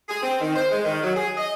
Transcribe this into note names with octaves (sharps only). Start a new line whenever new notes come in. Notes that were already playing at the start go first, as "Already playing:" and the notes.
G#4
C4
D#3
C5
G#3
D#3
F#3
G#4
D#5